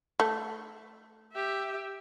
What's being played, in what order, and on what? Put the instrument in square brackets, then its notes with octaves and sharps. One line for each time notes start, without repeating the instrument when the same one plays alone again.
[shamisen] A3
[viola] G4 E5